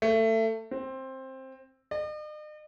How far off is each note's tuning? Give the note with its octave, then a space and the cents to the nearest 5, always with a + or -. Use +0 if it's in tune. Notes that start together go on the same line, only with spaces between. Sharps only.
A3 +25
C4 +15
D#5 -45